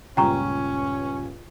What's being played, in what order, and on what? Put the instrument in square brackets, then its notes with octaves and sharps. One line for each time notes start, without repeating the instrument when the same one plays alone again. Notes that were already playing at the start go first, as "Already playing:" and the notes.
[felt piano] C#2 G2 A#2 [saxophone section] C#4 [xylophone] G5 A#5 C#6